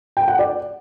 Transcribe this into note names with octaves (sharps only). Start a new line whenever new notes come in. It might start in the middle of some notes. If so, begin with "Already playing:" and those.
G5
F#5
D5